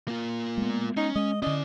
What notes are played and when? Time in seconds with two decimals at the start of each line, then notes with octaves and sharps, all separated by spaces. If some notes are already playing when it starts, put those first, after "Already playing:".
0.08 A#3 F4
0.57 G#3 B3
0.97 C#4 D#4
1.16 G#3 D#5
1.42 D3 C#4 E4 D5 D#5